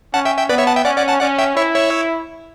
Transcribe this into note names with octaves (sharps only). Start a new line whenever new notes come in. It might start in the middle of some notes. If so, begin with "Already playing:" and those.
C#4 F#5 A5
E5 G5
E5 G5
B3 B4 D5
C#5 E5
F#5 A5
E5 G5
C#4 D5 F#5
D5 F#5
F#5 A5
C#4 D5 F#5
E5 G5
E4 C#5 E5
C#5 E5